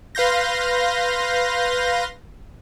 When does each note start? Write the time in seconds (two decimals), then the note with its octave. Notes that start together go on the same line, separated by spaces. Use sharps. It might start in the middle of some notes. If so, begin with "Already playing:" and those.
0.15 B4 F5 C6 G6 A#6